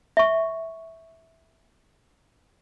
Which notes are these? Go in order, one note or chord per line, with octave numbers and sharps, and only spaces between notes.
E5 C#6